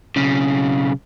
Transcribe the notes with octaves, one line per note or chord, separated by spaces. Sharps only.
B1 C#3